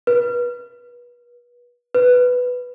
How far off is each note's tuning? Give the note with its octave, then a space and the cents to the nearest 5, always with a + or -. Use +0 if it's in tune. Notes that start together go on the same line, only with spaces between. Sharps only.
B4 -30
B4 +5